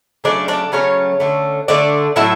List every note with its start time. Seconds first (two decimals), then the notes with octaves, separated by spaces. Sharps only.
0.24 C#3 F#3 A3 D4 D5
0.48 D4 D5
0.72 C#3 F#3 A3 C#4 C#5
1.20 D3 A3
1.68 D3 A3 D4 D5
2.16 A2 F#3 A3 E4 E5